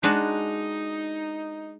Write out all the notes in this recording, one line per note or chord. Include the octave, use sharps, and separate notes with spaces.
G#3 D4 D#4 F#4